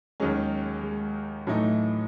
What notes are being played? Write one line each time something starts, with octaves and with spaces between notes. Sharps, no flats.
D#2 D#3 F#3 G#3 C#4
G#3
A2 E3 F#3 A3 D#4